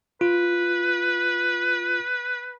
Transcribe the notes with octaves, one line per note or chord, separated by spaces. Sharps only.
F4 B4